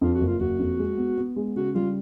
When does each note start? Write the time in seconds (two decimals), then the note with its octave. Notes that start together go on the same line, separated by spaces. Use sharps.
0.01 F2 F4
0.15 F#4
0.21 F#1
0.28 F4
0.40 F#1 F#4
0.59 F2
0.79 G#3
0.97 B3
1.18 B3
1.36 G#3
1.56 C#3 F#4
1.75 G3 F4